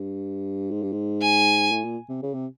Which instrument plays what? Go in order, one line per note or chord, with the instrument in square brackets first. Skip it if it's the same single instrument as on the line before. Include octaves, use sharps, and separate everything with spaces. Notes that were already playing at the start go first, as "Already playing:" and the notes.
Already playing: [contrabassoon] G2
G#2
G2
G#2
[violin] G#5
[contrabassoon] A2
A#2
C3
C#3
C3